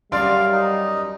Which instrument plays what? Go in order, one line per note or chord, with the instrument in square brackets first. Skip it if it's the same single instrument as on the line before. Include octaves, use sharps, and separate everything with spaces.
[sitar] F#2 A#4 D5 [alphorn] G3 [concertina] F5 [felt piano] C6
[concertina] D#4